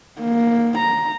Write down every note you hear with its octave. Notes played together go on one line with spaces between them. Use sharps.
A#3
A#5